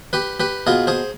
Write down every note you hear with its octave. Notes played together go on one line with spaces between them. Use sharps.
G4 B4
G4 B4
B2 F4 G#4
G#4 C5